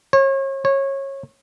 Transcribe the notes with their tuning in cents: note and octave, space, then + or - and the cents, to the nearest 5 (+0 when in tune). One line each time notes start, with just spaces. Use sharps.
C#5 -35
C#5 -20